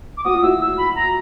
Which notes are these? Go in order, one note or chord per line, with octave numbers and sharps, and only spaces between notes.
D6
F#4 D#6
F4
E4 F#4 E6
E6
B5
A#5